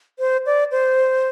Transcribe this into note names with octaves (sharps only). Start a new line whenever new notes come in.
C5
D5
C5